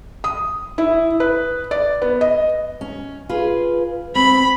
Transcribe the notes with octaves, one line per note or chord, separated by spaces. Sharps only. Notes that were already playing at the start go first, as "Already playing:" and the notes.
D#6
E4
B4
D5
B3
D#5
C#4
F4 G#4 B4
C4 B5